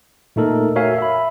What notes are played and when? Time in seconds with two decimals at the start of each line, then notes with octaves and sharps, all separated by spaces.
0.36 A#2 A3 D#4 A4 A#4
0.76 F#4 A#4 C#5 E5 F5 G#5
0.99 E5 B5